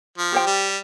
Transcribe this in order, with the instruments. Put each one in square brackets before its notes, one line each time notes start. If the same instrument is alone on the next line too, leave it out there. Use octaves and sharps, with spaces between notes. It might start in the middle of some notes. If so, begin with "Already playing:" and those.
[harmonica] F3
[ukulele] G4 C5 G5
[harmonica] G3